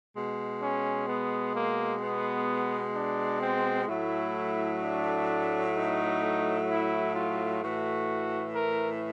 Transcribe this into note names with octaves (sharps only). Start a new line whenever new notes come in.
B2 G#3
C#4
B3
A#3
B3
D4
C4
A2 F#3 A3 E4
D4
D#4
E4
F4
A2 E3 A3 F#4
A#4